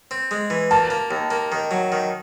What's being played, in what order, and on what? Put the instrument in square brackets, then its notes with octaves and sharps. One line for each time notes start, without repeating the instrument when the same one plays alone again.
[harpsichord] C4
G#3
E3
[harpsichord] A#3 [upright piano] A5
[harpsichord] A#3
D#2
A#3
D#3
F#3
D#3